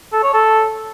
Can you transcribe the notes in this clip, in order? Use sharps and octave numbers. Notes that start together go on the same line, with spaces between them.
A4
C#5
A4